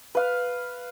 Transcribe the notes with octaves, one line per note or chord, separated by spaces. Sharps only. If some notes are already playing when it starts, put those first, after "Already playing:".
B4 F5